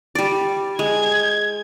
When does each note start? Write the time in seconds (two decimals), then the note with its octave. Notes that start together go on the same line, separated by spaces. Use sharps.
0.15 G3 D5
0.79 G#3 G#6